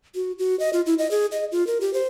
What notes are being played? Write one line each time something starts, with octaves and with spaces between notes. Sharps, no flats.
F#4
F#4
D#5
F4
E4
D#5
G#4
D#5
F4
A#4
G4
C5